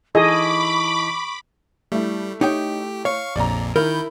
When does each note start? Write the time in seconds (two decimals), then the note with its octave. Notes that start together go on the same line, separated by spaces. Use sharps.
0.15 E3 D#4 G#4 A4 D#5 B5 C#6 D6
1.92 G3 A3 E4
2.41 D#4 G4 C#5 G5
3.05 C#5 F5 C#6
3.36 A#1 F2 A#2 D5 A#5
3.76 D#3 E4 A#4 B5 G6